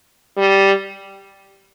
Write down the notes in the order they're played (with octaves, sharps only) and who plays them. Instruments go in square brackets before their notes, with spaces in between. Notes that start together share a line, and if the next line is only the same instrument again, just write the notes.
[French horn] G3